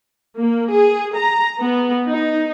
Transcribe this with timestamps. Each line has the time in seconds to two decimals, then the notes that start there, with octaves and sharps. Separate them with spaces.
0.38 A#3
0.70 G#4
1.15 A#5
1.60 B3
2.08 D#4